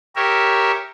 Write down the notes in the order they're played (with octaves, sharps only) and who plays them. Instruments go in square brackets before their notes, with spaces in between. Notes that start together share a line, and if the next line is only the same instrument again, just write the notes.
[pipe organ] G4 A#4 C#5 E5